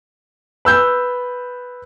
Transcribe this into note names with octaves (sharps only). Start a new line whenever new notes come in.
B4 E6 G6